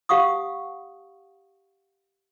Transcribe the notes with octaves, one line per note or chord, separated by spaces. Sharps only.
G4 F5 F#5 C#6 D#6